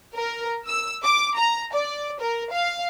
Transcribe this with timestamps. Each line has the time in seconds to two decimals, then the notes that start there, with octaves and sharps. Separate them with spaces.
0.14 A#4
0.66 E6
1.04 D6
1.38 A#5
1.74 D5
2.21 A#4
2.51 F5